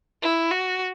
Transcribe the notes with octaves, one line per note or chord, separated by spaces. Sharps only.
E4
F#4